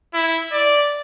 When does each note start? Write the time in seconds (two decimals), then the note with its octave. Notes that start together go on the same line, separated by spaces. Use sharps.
0.14 E4
0.52 D5